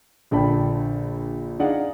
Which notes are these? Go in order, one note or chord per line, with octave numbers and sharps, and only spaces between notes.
A#1 D3 D4 G5 A5 B5
D4 D#4 G#4 D5 F5 F#5